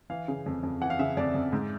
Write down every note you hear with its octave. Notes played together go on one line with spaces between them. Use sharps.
E3 F5
C#3
F2
F2
E3 F#5
F5
C#3 E5
F2 D5
F2
G#2